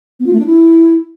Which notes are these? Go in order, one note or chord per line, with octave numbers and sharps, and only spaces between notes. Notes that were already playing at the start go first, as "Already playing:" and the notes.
B3
F4
A3
D4
E4